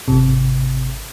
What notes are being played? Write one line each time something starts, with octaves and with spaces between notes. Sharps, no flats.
G#1 C3